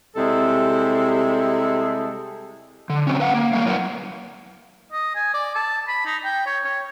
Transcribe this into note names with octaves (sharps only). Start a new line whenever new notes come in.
C3 G3 G#3 E4 A4
D3
C3 F#3 C4 C#4
B4 F5 F#5
A#3
G3 A#3 F5
F#3 E4 A#4 B4 D#5 F#5
D#5
G#5
D5
A5
B5
D#4
G5
C#5
C#5